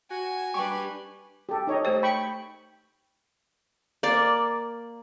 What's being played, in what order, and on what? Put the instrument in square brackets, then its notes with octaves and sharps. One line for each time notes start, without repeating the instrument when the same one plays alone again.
[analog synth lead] F#4 [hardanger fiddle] G#5
[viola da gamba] G3 D4 B4 [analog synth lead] G4 [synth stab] C#6
[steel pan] G4 A4
D#4 C#5 D#5
[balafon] A3 G4 C5
[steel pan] G5 B5 C#6
[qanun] A#3 D5